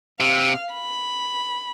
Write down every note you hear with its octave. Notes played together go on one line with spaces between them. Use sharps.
C3 F5
B5